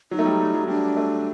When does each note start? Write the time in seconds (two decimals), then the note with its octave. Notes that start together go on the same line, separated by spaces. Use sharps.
0.11 F#3 D#4
0.19 A3
0.26 G3
0.40 G3
0.54 F#3
0.68 G3 D4
0.97 A3